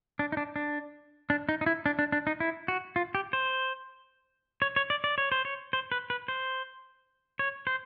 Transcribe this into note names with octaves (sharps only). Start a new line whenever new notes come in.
D4
D#4
D4
D4
D4
D#4
D#4
E4
D4
D4
D4
D#4
E4
F#4
F4
G4
C5
C#5
C#5
D5
D5
C#5
C5
C#5
C5
B4
B4
C5
C#5
C5